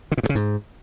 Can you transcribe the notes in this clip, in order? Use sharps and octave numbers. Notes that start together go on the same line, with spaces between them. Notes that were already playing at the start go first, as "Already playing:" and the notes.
D3
A#2
G2
C#3
G#2